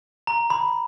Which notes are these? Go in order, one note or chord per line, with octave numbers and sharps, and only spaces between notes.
A#5
B5